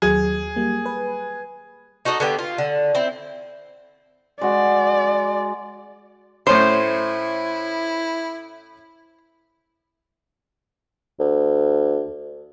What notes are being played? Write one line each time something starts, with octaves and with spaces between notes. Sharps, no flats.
D#2 F#3 G#4
G3 A#3
B4
D#4 F#4 A4 D#5
D3 B3 G4
F4
D3
C4 E4
G#3 F#4 D5
A2 C#4 E4 C5 C6
D2